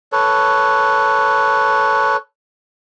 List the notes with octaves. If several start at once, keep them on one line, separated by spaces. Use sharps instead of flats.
A4 B4 C#5